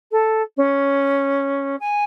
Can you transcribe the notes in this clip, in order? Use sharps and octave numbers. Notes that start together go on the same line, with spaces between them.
A4
C#4
G#5